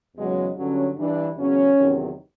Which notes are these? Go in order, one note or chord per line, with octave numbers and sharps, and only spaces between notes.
E2 C#3 F#3 G#3
G2 D3 F#3 C#4
G2 E3 D4
E2 C#3 F#3 C#4
E2 C3 D#3 F#3